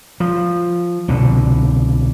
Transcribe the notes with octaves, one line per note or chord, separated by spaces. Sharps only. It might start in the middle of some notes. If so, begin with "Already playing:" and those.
F3
C2 B2 D3